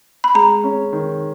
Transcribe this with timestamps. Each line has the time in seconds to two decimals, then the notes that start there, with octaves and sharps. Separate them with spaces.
0.24 B5
0.35 G#3 A#5
0.64 C#4
0.93 D#3